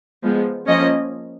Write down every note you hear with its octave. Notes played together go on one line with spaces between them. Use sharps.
F3 G#3 B3
F3 A#3 C#4 D#5